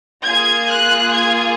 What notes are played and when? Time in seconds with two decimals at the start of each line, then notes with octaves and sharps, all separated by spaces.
0.25 A#3 F4 G#4 G#6
0.70 F#6
1.14 G#6